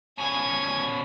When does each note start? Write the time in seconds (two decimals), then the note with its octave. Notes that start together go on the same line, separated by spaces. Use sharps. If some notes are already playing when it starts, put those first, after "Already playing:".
0.18 B2 C#4 G#5 G#6